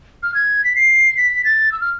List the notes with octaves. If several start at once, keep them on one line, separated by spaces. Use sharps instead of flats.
F6
G#6
B6
C7
B6
A6
E6
F6